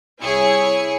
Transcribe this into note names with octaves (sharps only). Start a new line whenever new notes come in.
C2 E4 G#4 C#5 G#5 C#7